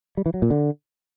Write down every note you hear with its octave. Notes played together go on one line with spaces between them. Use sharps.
G3
E3
F#3
A#2
D3